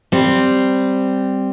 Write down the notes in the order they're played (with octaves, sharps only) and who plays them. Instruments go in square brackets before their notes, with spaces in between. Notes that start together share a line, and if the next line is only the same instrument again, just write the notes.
[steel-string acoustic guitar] G3 C4